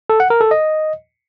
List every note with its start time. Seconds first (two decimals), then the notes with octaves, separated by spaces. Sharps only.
0.10 A4
0.20 F#5
0.30 A#4
0.41 A4
0.51 D#5